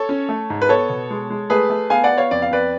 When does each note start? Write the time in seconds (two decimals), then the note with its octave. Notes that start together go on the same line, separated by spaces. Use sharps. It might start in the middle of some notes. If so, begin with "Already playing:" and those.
Already playing: A4 C#5
0.09 C#4
0.29 A3
0.50 G#2
0.62 B4
0.69 B3 A4 C#5
0.89 B2
1.11 G#3
1.30 G#3
1.50 A3 G#4 B4
1.70 A3
1.90 B3 F5 G#5
2.04 D5 F#5
2.11 B3
2.18 C#5 F5
2.31 F2 D5
2.42 F5
2.51 F2 B4 D5